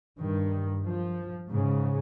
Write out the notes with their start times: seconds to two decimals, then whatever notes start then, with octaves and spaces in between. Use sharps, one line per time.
0.19 G2 D#3
0.85 F3
1.51 G#2 C#3